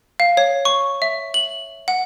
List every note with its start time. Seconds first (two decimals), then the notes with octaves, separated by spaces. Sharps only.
0.20 F5
0.37 C#5
0.65 C#6
1.02 E5
1.34 F#7
1.88 F#5